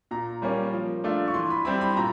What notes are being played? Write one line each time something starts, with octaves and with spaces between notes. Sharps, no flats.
A#2 A#5
G3 A#3 C#4
F3
A3 D4 F4
C#6
E3 C6
B5
G3 C4 E4 B5
B5
A#2 A#5